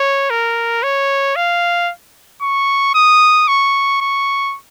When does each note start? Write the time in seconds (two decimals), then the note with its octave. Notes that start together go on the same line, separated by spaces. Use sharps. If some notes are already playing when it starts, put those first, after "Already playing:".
Already playing: C#5
0.30 A#4
0.83 C#5
1.36 F5
2.42 C#6
2.95 D#6
3.48 C#6
4.01 C#6